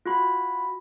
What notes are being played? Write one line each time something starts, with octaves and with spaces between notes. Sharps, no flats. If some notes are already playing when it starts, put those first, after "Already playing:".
F4 F#4 B5